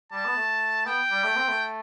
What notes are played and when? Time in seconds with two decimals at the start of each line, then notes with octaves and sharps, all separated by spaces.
0.12 G3 A5
0.25 B3
0.37 A3
0.86 B3 G5
1.11 G3
1.24 A3
1.36 C4
1.48 A3